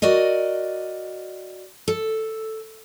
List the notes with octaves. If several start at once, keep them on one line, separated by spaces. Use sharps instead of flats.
F#4 A#4 D5 D#5
A4